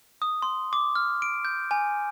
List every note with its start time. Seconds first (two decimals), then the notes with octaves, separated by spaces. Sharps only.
0.22 D#6
0.42 C6
0.73 D6
0.95 F6
1.22 D7
1.45 G6
1.71 G#5